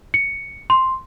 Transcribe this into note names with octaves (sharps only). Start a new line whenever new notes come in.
C#7
C6